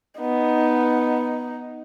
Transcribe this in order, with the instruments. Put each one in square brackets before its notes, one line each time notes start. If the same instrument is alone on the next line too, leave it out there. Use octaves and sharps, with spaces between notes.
[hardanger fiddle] B3 [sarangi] D#4